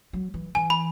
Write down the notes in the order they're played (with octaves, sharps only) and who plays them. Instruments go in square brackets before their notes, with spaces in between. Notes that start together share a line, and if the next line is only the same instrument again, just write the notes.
[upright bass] F#3
E3
[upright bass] E3 [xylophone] G#5
[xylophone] B5